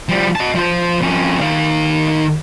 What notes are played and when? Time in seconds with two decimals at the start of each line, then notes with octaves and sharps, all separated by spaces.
0.09 F3 G3
0.36 D#5 A5
0.55 F3 C5
1.02 F2 C#4
1.41 D#3 F5